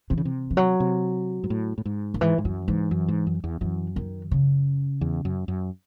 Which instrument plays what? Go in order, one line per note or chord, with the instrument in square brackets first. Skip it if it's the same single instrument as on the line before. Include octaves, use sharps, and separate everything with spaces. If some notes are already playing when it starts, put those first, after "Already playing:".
[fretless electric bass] C3 [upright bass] E3
[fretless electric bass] C#3
C3
[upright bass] E3
F#3
[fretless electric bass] C3
G#2
A2
A2
G#2
[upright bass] D#3
[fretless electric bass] G#2 [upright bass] E3
[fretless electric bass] G#2
[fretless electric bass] F#2 [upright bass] F#3
[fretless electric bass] G#2 [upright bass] E3
[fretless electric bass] F#2
G#2
F#2
E2
[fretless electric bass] F#2 [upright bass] E3
[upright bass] D#3
C#3
[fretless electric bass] E2
F#2
F#2